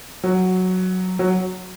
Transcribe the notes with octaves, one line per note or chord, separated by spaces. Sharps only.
F#3
F#3